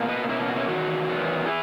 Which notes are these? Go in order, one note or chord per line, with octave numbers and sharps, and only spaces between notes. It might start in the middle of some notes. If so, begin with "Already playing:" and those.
Already playing: B2 A#3
B4 D#5
B2 A#3 C#4 E4
C#4
F#4
C#4 E4
E2 D#3 F#3 F#4
E2 D#3 F#3 B3
E4 G#4